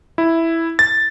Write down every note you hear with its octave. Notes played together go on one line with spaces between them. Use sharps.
E4
A6